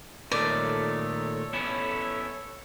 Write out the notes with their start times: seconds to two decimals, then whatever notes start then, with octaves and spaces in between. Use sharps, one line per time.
0.32 A#2 D#3 A3 A4 C#5 D5
1.53 B3 C#4 E4